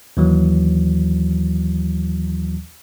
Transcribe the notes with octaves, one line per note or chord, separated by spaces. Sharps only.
D#2 E3 F#3